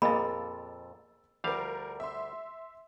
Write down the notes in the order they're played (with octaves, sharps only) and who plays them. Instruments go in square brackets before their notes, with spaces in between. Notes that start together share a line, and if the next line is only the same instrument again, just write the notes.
[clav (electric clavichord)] F2 A#2 [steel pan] A#3 G#4 D#5 [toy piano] B5 [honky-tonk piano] E6 A6
[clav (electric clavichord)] D2 G3 F5 [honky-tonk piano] F3 A#4
[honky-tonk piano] E5 C6